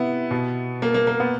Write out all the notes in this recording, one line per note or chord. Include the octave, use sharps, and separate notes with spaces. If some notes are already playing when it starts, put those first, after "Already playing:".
Already playing: C3 B3 E4
B2
A#3
A#3
A#3
B3